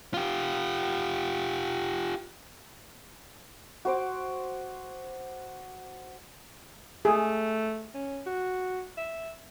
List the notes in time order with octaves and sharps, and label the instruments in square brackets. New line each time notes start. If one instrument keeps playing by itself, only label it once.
[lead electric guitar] F4 G4
[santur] F#4 C5 D6
[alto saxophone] A3 [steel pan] G#4
[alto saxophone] C#4
F#4
E5